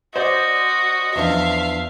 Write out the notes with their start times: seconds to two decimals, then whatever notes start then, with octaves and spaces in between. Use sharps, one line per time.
0.16 F#4 C5 D5 D#5
1.16 E2 F3 D4 E5 F5